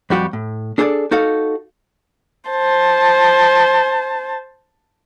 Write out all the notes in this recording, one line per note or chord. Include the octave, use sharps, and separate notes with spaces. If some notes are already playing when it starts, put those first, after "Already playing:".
F2 G3 F#4 G4
A2
D4 G#4 A4 C5 D5
D#4 F#4 A4 F5
C5 A5